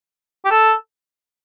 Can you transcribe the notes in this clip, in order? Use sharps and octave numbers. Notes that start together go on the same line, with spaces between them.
G4
A4